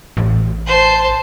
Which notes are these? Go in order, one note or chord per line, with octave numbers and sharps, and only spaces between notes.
A1
C5 A5